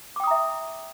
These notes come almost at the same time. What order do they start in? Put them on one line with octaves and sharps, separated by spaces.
D6 G5 D#6 A#5 E5